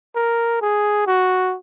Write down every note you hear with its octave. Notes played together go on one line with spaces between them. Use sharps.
A#4
G#4
F#4